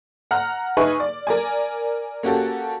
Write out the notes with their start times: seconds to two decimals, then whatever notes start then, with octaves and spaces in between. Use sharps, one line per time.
0.31 F#5 A#5 F6
0.77 D#4 G#4 B4 E5 G#5 C#6
1.00 D5
1.27 A#4 D5 G#5
2.23 A#3 C#4 F#4 G4 A4